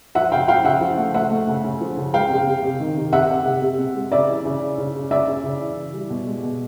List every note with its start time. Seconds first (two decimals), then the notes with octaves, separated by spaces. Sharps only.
0.15 F3 E5 F#5
0.32 C#3 F5 G5
0.48 F3 F5 G5
0.64 C#3 E5 F#5
0.81 F3
0.98 A3
1.14 A3 E5 F#5
1.31 A3
1.47 C#3
1.64 C#3
1.81 F3
1.97 C#3
2.13 G#3 F5 G5
2.30 C3
2.46 C3
2.63 C3
2.80 D#3
2.96 C3
3.12 C3 E5 F#5
3.29 C3
3.46 C3
3.62 C3
3.79 C3
3.95 G#3
4.12 C#3 D5 E5
4.28 E3
4.45 C#3
4.61 C#3
4.78 C#3
4.95 C#3
5.11 C#3 D5 E5
5.27 C#3
5.44 C#3
5.61 E3
5.77 E3
5.94 G3
6.10 B2
6.26 G#3
6.43 B2